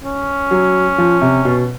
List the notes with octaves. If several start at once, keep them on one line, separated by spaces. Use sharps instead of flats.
C#4
F#3
F3
C3
B2